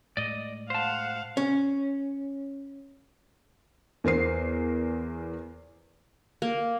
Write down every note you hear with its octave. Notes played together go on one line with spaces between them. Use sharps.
A2 G#3 D5 D#5
C5 F5 F#5 A5
C#4
E2 A#4 C5 C7
A#3